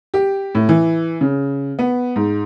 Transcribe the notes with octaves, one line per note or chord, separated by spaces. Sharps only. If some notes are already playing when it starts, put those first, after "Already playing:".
G4
A2
E3
C#3
B3
G#2